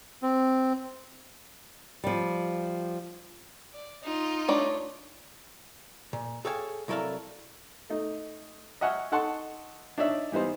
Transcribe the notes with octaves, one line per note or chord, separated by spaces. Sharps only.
C4
F3 G3
D5
D#4 F4
A3 D4 C#5
A#2
G#4 A4 C#5 F5 G5 G#5
C2 F#3 E4 A4 A#4 F5
A3 D#4
D#5 E5 F#5 G#5 C#6 F6
D#4 A4 F#5 A5 C6 C#6
D4 D#4 C#5 D5 E5
E3 G3 B3 D#4 C5